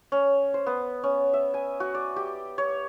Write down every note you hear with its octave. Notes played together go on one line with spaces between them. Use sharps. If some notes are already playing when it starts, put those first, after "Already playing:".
C#4
C5
B3
C#4
E5
G#5
F#4
D5
G4
C#5